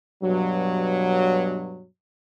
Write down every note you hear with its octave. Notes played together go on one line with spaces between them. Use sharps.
G2 B2 F#3